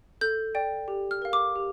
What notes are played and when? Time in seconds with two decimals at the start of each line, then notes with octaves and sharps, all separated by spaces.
0.21 A4 G6
0.55 D5 G5
0.88 G4
1.11 F6
1.22 A#4 F5
1.33 D6
1.56 G4